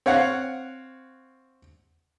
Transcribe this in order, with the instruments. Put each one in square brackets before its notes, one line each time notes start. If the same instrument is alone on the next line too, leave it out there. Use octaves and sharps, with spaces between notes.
[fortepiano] C4 C#5 F5 F#5